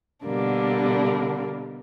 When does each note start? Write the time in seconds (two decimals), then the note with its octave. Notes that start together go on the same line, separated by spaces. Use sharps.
0.25 B2 D3 G3 A#3 D4